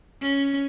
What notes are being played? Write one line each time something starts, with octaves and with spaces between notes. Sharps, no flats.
C#4